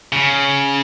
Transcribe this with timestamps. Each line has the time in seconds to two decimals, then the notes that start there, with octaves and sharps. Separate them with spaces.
0.13 C#3